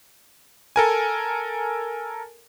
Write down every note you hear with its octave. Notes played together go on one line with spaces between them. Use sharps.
A4 A#4 G#5